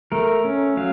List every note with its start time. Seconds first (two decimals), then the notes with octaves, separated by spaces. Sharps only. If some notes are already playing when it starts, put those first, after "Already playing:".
0.12 A3 A#4
0.45 C#4
0.77 F#3 F5